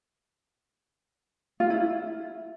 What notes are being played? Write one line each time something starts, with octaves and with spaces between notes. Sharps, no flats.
F4
E4
E4